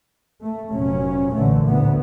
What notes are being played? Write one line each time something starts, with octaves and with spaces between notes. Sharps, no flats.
A3
F1 A#2 F#3 C#4
A#1 A#2 D3 E3 A3
D2 A2 D3 B3